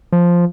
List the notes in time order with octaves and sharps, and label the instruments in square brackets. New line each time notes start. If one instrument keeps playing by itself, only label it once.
[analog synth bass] F3